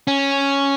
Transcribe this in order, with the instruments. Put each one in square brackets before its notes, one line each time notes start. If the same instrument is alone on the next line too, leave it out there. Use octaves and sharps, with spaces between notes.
[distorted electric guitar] C#4